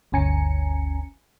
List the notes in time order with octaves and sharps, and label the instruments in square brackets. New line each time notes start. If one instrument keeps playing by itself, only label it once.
[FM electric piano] G1 D2 C#4 G#5 A#5 C#7